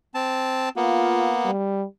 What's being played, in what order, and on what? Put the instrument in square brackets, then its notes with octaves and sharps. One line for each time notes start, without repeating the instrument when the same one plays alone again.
[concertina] C4 A5
[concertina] A#3 B3 [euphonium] F4
[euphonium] G3